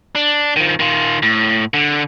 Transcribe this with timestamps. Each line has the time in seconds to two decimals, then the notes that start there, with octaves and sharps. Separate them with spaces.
0.15 D4
0.56 D#3 F3
0.80 D#3 F4
1.23 A2
1.74 D3